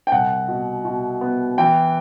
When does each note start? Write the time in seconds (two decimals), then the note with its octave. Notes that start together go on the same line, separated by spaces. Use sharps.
0.07 G5
0.12 C2 F#5
0.48 B2
0.85 B2
1.21 B3
1.58 E3 G5